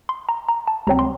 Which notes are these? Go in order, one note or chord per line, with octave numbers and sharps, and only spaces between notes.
C6
A#5
A#5
A5
C#2 C3 F#3 C4 A#5
C6